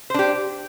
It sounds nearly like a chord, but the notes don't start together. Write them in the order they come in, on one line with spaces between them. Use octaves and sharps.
C5 D4 G4